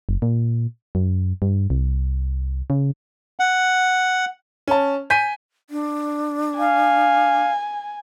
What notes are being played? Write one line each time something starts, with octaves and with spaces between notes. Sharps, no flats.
F#1
A#2
F#2
G2
C2
C#3
F#5
C#4 A5
G#5 G6 B6 D#7
D4
F5 G#5